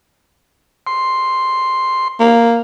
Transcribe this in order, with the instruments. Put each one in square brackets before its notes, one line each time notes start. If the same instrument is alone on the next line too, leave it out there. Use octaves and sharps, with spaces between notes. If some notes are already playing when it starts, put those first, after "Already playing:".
[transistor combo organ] C6
[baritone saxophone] A#3